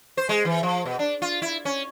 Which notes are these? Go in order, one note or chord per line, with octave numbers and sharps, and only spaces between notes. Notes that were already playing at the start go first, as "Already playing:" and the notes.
C5
G#3
E3
F3
B2
D4
F4
E4
C#4